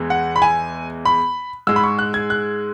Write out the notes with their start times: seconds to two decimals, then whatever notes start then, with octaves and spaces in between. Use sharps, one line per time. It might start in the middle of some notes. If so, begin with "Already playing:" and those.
Already playing: E2 E3 G#3
0.10 F#5
0.36 B5
0.42 G#5
1.05 B5
1.67 G#2 G#3 E6
1.76 B5
1.84 C#6
1.99 F#6
2.14 G#6
2.30 F#6